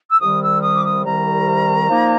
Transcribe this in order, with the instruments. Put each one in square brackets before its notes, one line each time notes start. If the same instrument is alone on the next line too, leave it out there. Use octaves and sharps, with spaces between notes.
[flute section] E6
[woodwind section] C2 C3 D#3 G3 [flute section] D#6
[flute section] E6
D#6
D6
D#6
[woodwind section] C2 C3 D#3 G3 [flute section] A#5
[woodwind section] A#2 F3 A#3 D#4